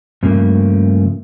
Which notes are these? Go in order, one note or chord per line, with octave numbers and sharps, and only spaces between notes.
G2 C#3 F3 A3 A#3